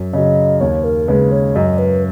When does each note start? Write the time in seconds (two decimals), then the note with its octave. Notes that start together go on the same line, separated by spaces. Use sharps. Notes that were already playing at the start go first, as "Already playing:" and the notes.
Already playing: F#2
0.13 C#3 F#3 D#5
0.61 D#2 C#5
0.84 A#4
1.08 C#3 G#3 B4
1.32 C#5
1.55 F#2 D#5
1.78 B4